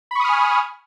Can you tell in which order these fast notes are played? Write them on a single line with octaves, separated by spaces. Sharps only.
B5 C#6 D#6 F6 G#5